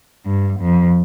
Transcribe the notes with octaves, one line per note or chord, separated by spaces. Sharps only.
G2
F2